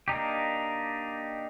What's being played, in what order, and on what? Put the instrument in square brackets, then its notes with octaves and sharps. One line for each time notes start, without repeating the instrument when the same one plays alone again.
[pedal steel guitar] A#3 D4 D#4 G4